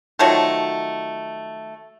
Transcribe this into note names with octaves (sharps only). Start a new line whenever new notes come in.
D#3 F3 F#3 A3